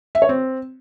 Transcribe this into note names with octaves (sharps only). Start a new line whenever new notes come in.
E5
C#5
C4